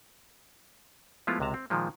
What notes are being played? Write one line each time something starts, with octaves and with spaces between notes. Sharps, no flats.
F3 G#3 A3 B3 E4 F4
C#2 C3 G#3 A5 A#5
C4
A#2 D#3 F3 G#3